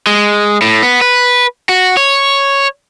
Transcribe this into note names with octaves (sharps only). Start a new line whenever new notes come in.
G#3
A2
B3
B4
F#4
C#5